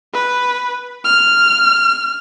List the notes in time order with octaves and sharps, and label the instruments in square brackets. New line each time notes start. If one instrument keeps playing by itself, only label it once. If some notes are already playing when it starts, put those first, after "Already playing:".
[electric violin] B4
F6